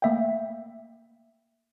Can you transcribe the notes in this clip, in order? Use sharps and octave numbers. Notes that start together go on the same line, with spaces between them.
A3 A#3 E5 F5 G5